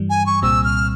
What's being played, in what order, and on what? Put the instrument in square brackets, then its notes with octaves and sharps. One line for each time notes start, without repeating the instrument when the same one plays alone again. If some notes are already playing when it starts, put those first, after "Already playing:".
Already playing: [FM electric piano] G2 E3 G3
[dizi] G#5
C#6
[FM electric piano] C2 A#2 G3 C4 [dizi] E6
[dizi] F6